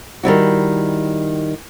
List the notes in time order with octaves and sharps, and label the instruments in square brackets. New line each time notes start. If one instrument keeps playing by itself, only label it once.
[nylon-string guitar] D#3 G3 E4 F#4